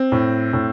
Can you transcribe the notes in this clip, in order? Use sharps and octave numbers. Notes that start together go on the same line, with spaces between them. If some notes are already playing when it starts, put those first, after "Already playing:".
Already playing: C4
A2
A2